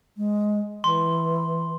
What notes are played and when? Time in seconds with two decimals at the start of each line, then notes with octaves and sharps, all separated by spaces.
0.17 G#3
0.84 E3 C6